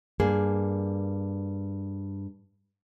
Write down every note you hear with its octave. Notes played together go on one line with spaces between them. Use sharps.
G2 A#3 G#4